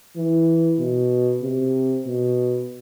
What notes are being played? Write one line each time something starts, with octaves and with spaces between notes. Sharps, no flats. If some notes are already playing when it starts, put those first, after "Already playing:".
E3
B2
C3
B2